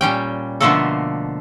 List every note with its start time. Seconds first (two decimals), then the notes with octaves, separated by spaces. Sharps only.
0.01 A#2 G3 C#4 G5
0.60 B2 D3 F3 A3 A#3 A4